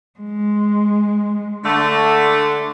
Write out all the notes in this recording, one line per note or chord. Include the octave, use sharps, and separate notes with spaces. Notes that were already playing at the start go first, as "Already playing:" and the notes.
G#3
D3 A3